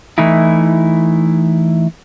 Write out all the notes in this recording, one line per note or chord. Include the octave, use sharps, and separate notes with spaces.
E3 A3 D#4 E4